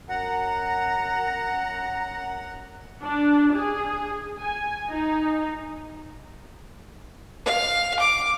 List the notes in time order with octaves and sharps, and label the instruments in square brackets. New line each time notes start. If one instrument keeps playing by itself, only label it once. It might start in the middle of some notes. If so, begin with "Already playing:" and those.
[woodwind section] F#2 A#5 [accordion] F#5
[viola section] D4
G#4
G#5
D#4
[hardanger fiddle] F5
D6